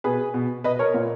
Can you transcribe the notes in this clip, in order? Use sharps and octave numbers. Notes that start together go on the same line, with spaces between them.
B2 G#4 B4
B2
B2 B4 D#5
A#4 C#5
A#2